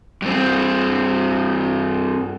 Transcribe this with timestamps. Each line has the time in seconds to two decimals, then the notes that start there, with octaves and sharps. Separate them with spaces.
0.22 G2 C4